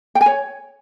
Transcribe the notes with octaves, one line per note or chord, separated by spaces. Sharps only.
G5
G#5
C#5